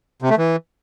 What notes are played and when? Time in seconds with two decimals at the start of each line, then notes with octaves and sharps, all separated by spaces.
0.22 C3
0.30 A3
0.38 E3